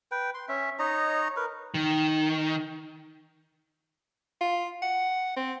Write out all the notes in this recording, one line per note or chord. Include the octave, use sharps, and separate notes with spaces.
B4 G5
C6
C#4 E5
D#4 C#5 D#5 A#5
A#4 B4
D#3
F4
F#5
C4